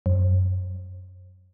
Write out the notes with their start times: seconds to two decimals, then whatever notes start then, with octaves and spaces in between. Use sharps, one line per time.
0.06 F#2